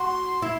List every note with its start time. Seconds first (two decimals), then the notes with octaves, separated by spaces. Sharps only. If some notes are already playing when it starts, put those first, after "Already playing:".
Already playing: F#4 C6
0.42 E4